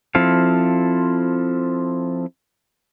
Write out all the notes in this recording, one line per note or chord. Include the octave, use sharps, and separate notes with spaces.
F3 C4 E4 A4 F5